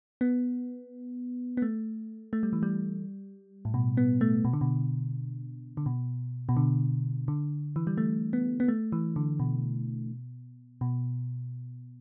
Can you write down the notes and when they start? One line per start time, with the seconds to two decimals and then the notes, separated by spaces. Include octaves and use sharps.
0.21 B3
1.57 B3
1.62 A3
2.33 A3
2.43 G3
2.53 E3
2.63 G3
3.65 A2
3.74 B2
3.97 B3
4.21 A3
4.45 B2
4.53 D3
4.61 B2
5.77 D3
5.86 B2
6.49 B2
6.57 D3
7.28 D3
7.76 E3
7.87 G3
7.98 A3
8.33 B3
8.60 B3
8.68 A3
8.92 E3
9.16 D3
9.39 B2
10.81 B2